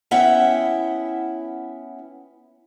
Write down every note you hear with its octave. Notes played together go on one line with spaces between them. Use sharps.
B3 C#4 E4 E5 F#5 G5